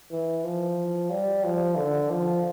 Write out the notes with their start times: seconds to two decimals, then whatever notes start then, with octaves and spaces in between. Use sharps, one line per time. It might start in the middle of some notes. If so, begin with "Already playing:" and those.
0.11 E3
0.44 F3
1.10 G3
1.44 F3
1.77 D3
2.10 F3